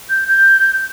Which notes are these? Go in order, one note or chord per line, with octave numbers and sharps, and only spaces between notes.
G6
G6